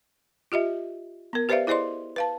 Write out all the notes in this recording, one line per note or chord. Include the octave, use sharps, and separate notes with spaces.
F4 G4 D#5 E5
B3 A#4
G4 B4 C5 D5 E5 F5
E4 G#4 C5 D5 D#5 C6
B4 F5 A5